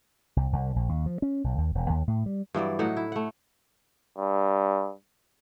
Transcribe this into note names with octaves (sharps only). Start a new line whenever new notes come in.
C2
C2
A#1
D#2
F3
C#4
B1
D#2
E1
D#2
A2
G3
G2 E3 F#3 D5
A2 F#3 D#4 F#5
E4
A3 F#5
G2